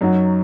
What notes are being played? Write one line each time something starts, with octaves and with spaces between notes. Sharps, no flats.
F#2 F#3 D#4 F#4